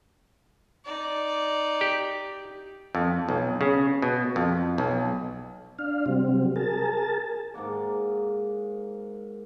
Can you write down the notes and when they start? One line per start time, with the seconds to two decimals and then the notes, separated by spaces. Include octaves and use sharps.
0.84 D#4 D5
1.81 G4
2.95 F2
3.29 B1
3.61 C#3
4.02 B2
4.36 F2
4.78 B1
5.79 D4 F5
6.06 C3 F#3 G3 C4
6.56 G#4 A#4 A5
7.54 G#2 A#3 F#5 D6